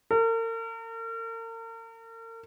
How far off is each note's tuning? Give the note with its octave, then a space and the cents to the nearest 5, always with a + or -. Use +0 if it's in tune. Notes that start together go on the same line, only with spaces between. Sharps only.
A#4 -40